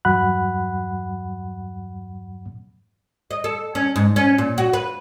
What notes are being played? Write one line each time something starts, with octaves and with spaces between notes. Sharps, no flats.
E2 G2 F#3 F#5 B5 F#6
D#5
A4
C#4
G#2
C#4
A#2
F#4
B4